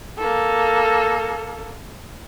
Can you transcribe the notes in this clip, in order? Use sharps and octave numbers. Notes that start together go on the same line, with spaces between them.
A#3 A4